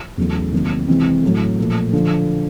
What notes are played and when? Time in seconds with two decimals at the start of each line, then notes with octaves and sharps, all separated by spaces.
0.18 E2 C#3 F#3 A3 C#4
0.53 C3 D#3 F#3 A#3
0.88 C3 E3 G#3 C4
1.23 A2 F#3 A3
1.59 A#2 F3 A3
1.93 D3 F3